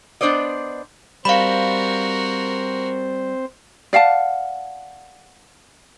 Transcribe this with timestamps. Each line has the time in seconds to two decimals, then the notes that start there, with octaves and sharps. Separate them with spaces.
0.21 B3 D4 C5 D5 D#5
1.25 G3 C4 F#4 A#4 C5 F5 B5
3.93 D5 F5 F#5 A5